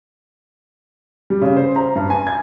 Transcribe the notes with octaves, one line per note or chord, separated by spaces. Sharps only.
G3
C#3
C5
A#5
G2
G#5
G#6